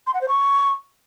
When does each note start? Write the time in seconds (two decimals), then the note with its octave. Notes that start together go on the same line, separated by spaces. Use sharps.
0.07 C6
0.14 F#5
0.21 C5
0.28 C#6